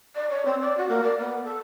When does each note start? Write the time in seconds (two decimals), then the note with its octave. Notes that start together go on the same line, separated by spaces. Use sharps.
0.15 D5
0.29 C#5
0.45 C4
0.61 D5
0.77 F#4
0.89 A#3
1.03 D5
1.19 B3
1.44 A4